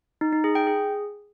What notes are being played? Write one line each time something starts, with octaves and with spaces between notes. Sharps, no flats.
D#4
D#4
G#4
G5
G#4